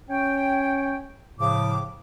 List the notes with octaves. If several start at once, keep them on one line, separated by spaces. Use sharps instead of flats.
C#4 C#5 G5
A2 C#3 F3 D6